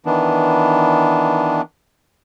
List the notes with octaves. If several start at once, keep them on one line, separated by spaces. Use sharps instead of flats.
D#3 E3 B3 D4